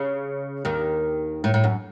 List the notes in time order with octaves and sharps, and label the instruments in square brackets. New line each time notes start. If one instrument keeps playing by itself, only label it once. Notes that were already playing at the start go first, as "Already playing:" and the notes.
Already playing: [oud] C#3
D#2 D#3
A2
A2
F#2